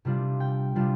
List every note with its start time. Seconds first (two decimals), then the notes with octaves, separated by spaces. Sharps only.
0.05 C3 G3 D4 F4
0.40 G5
0.75 C3 G3 D4 F4